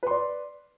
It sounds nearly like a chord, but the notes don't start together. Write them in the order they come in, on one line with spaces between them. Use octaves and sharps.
B4 C6 D5